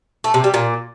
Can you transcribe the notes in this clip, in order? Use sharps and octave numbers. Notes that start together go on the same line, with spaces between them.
A3
C3
G3
A#2